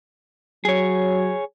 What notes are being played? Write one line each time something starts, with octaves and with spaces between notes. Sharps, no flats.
F#3 G#4 C#5